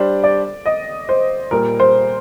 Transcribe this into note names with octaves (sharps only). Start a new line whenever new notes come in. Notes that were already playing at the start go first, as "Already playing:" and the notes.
Already playing: G3 D4 G4 C5 D5
D5
D#5
C5
A#2 G3 A#3 A#4
C5